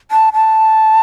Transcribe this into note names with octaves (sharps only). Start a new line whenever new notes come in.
A5
A5